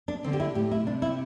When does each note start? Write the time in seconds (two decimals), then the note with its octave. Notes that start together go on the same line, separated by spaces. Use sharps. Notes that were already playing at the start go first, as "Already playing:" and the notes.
0.08 D4
0.24 D3 C4
0.33 G4
0.40 E4
0.55 A2 G4
0.71 E4
0.86 C3 D4
1.02 E4